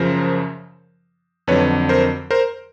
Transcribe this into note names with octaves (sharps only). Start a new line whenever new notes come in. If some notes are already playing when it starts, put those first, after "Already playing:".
Already playing: F#2 C#3 F3 A#4 C5
F2 D3 F#3 B4 C#5
A#4 C5
A#4 C5